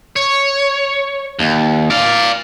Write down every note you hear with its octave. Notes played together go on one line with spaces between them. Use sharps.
C#5
D#2
D5 F5